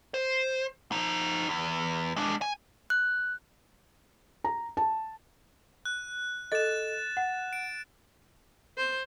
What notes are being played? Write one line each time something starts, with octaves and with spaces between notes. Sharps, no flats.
C5
F3 D#4
E2
G#3 D4
G#5
F#6
A#5
A5
F#6
A4 D#5 A6 E7
F#5
D7
C5